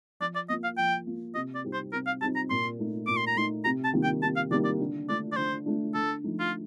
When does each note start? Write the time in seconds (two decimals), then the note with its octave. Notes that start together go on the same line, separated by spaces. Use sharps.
0.20 F3 D5
0.35 D5
0.49 A#3 F4 D#5
0.63 F5
0.77 F3 G5
1.06 A#3 F4
1.35 C3 D#5
1.55 D5
1.64 G3 C4 D#4 G4
1.73 C5
1.93 C3 A#4
2.06 F5
2.21 G3 C4 D#4 G4 A5
2.36 A#5
2.50 A#2 C6
2.79 A3 D#4
3.07 A#2 D6
3.17 C6
3.27 A#5
3.36 A3 D#4 C6
3.64 C3 A#5
3.84 A5
3.93 D#3 G3 A#3 D#4
4.03 G5
4.22 C3 A5
4.36 F5
4.50 D#3 G3 A#3 D#4 D5
4.65 D5
4.80 D3
5.08 A3 D4 D5
5.32 D5
5.36 D3 C5
5.66 A3 D4
5.94 D3 A4
6.24 F3 A3 D#4
6.39 F4